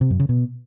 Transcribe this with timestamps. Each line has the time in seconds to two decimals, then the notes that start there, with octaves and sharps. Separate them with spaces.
0.01 C3
0.10 F#2
0.20 C#3
0.29 B2